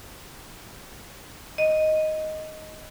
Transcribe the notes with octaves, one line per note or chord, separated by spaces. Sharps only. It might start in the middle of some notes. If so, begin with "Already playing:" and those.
D#5